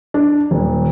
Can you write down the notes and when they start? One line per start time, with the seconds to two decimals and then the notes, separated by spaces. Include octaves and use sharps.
0.14 D4
0.51 D#1